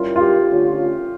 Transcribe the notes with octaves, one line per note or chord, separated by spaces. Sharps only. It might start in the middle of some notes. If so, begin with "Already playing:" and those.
Already playing: G3 C#4 E4 F4 A#4 C#5
F4
G4
D3 A3 C#4 F4 C#5